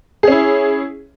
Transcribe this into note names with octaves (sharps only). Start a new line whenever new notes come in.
C#4 E4 G#4